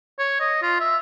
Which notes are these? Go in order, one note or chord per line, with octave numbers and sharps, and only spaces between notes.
C#5
D#5
F4
E5